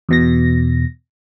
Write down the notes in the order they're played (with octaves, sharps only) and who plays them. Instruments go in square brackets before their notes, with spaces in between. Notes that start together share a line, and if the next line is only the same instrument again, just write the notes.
[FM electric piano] E2 B2 A#6